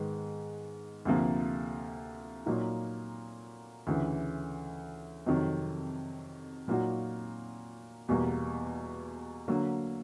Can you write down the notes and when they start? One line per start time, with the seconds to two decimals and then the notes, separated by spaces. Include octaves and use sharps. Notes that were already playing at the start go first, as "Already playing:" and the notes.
Already playing: G#2 D#3 G#3 B3
1.05 D2 C3 F3 A#3
2.46 A#2 F#3 A#3 D#4
3.87 D2 C#3 E3
5.26 F2 C3 D#3 F#3
6.68 A#2 F#3 A#3 D#4 F#4
8.08 E2 B2 G3 A#3
9.48 D3 F#3 A#3